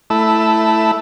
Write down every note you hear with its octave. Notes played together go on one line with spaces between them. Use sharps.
A3 E4